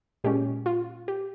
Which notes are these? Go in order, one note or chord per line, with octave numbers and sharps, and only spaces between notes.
A#2 G#3 C#4 G4
F4
G4